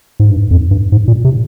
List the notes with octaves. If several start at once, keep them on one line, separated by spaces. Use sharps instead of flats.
G#2
G2
F2
G2
G#2
A#2
C3